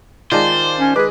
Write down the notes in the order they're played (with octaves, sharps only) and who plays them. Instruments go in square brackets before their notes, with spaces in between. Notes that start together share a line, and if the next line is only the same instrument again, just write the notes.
[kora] D#3 G#3 [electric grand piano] F4 D5 A5 [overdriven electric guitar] C5
[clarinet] C#4
[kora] G#3 [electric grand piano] G#4 D6 [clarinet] B4